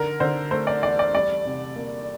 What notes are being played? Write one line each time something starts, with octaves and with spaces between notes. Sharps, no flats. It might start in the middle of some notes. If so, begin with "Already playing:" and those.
Already playing: D3 A#4
D3 C5
A3 C5
D5
E2 D5
D5
G3 D5
C3
A#3